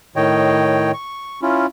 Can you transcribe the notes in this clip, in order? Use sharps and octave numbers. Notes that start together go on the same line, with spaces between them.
A2 D#3 C#5 D#5 G5
C#6
C#4 E4 F4